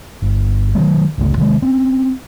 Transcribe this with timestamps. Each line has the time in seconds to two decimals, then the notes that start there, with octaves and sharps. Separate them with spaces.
0.22 G1
0.75 D#3 E3 F#3 A3
1.18 G1 C#2 A3
1.37 C3 D#3 F#3 G#3
1.62 C4 C#4